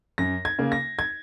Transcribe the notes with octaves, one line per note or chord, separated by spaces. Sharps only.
F#2 A#6
G#6
C#3 A#3
A#6
G#6